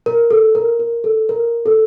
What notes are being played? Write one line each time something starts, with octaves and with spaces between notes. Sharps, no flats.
A#4
A4
A#4
A#4
A4
A#4
A4